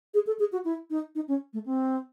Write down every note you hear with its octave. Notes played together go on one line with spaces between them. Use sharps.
G#4
A4
G#4
F#4
E4
D#4
D#4
C#4
A3
C4